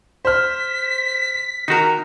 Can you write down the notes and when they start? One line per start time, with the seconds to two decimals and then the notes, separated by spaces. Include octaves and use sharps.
0.25 C5 F6 B6
1.68 D#3 D#4 F#4 A#4